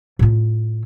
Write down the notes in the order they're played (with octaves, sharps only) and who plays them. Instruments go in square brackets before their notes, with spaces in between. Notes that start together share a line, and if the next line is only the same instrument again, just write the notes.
[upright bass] A2 F4